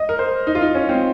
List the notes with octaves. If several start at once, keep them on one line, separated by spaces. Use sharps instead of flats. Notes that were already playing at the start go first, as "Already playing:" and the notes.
Already playing: D#5
A#4
C5
D#4
F4
D#4
C#4
C4